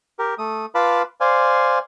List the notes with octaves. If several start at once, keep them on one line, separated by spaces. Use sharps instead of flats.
G4 A#4
A3 D#6
F4 B4 F5 A5 B5 D6
C5 D5 F5 G#5